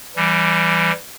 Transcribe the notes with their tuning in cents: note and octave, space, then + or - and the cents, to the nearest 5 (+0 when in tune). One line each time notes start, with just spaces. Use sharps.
E3 +25 G3 +0